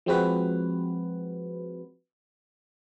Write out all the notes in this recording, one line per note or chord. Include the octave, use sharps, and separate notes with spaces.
F3 G#3 C4 F#4 B4